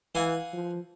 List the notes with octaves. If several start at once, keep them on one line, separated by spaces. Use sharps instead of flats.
E3 F5 F#5 G#5
F3